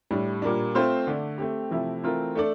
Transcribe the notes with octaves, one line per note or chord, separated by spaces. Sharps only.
A2 G3 D4
A#2 G3 A#3 D4
A3 C4 F4 C5
D3 A3 D4
A3 C4 G4
C3 F3 A3 E4 G4
E3 A3 C4 F4 A#4
A3 D4 A4 D5